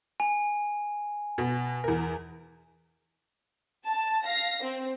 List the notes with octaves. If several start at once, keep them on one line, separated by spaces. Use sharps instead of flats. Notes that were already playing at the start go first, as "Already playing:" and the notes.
G#5
B2
E2 A#4
A5
F5 A#6
C4